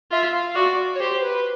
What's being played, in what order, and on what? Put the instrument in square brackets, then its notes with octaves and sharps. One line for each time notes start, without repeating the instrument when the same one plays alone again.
[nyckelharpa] F4 [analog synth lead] E5
[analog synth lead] F5
[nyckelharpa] F#4 [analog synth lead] D5
[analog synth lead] C#5
[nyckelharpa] G4 [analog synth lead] C5
[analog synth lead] B4